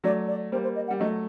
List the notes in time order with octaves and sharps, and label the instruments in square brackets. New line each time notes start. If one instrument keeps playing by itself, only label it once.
[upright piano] F#3 A3 [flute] D5
[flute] D5
[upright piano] G3 A#3 [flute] C5
[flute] C5
D#5
F#5
[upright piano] G3
[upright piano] F#3 A3 [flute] D#5